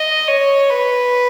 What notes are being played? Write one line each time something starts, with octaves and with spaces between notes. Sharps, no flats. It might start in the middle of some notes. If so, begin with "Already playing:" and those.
Already playing: D#5
C#5
B4